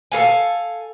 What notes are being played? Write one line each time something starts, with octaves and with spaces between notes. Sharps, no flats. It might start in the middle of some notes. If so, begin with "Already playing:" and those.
A4 A#4 F5 G#5